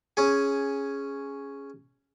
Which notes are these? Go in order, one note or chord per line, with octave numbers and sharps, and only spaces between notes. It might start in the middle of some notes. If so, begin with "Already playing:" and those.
C#4 G#4